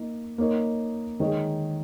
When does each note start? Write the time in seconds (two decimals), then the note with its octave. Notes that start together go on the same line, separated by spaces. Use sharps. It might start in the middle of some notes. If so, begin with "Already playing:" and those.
Already playing: A#3 D#4
0.38 A#3 D#4 A#4 C#5
1.20 D#3 G#3 D#4 G#4 C#5